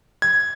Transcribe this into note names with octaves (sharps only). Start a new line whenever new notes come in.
G#6